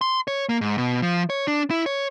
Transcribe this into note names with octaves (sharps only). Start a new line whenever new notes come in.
C6
C#5
A#3
G#2
B2
F3
C#5
D4
E4
C#5